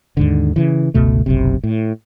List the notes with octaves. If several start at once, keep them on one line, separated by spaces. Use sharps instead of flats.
D#2 G#2 D3
C#3 E3
G1 C#2 B2 A3
F#1 B1 C3
A2